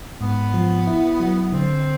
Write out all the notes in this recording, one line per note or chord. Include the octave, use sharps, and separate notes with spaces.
G#2 B3
F3
E4
F#3
D3 C4